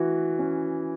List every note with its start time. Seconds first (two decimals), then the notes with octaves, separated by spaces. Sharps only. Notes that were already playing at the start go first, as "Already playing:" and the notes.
Already playing: E3 F#4
0.39 C#4